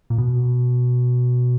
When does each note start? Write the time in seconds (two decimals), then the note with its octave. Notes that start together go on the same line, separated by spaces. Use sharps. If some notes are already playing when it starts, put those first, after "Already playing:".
0.10 A#2
0.18 B2